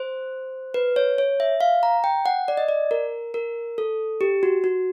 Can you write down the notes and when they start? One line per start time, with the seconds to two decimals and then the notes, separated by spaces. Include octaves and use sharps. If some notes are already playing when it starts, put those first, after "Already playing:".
Already playing: C5
0.74 B4
0.96 C#5
1.18 C#5
1.40 E5
1.61 F5
1.83 A#5
2.04 G5
2.26 F#5
2.48 D5
2.57 D#5
2.68 D5
2.91 A#4
3.34 A#4
3.78 A4
4.21 G4
4.43 F#4
4.64 F#4